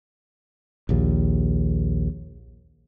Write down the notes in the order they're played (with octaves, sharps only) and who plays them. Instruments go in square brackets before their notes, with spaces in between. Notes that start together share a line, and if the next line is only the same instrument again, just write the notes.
[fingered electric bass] A#1 D#2